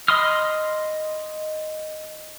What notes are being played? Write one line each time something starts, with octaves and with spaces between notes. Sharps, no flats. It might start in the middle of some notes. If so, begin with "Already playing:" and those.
D#5 B5 C6 D#6 F6